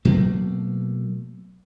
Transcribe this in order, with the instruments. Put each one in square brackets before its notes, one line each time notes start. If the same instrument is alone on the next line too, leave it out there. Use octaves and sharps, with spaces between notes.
[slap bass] B2 F#3 A3 A#3